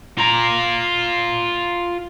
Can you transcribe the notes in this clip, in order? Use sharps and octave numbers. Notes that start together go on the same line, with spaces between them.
F4 A#5